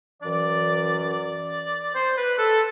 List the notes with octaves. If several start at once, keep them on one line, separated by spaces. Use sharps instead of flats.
F#2 E3 D5
D5
C5
B4
A4